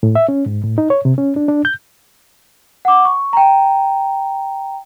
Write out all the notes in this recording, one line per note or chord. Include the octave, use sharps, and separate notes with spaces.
A2
E5
C#4
G#2
A2
D#4
C#5
C3
C#4
D4
D4
G6
F#5 D6
C#6
G5 A#5